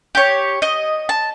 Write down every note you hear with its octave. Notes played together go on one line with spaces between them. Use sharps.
G4 C#5
D#5
A5